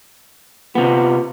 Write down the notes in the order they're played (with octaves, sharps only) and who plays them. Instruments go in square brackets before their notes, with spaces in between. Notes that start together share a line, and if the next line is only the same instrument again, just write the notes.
[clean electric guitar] C3 B3 [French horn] F4